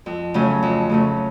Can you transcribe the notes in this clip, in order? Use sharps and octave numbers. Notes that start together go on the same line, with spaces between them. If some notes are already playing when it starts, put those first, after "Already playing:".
F2
C#3 F#3 A3 C#4
F2
C#3 F#3 A3 C#4